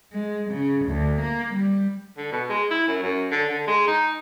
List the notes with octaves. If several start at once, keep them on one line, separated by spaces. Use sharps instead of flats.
G#3
C#3
D2
A#3
G3
D3
B2
G#3
E4
F#2
F#2
D3
D3
G#3
D#4